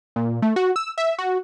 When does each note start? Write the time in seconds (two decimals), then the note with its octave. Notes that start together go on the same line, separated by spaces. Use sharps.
0.16 A#2
0.42 A3
0.56 F#4
0.76 E6
0.98 E5
1.19 F#4